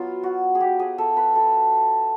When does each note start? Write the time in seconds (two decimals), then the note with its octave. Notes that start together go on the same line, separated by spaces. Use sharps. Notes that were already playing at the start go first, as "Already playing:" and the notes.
Already playing: F#3 B3 E4 F4
0.23 F#4
0.55 G#4
0.60 G4
0.80 G#4
0.98 A4
1.17 B4
1.35 A4